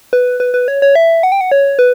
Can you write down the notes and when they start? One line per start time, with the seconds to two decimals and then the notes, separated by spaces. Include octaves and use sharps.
0.13 B4
0.40 B4
0.54 B4
0.68 C#5
0.82 C#5
0.95 E5
1.23 F#5
1.32 G5
1.41 F#5
1.52 C#5
1.79 B4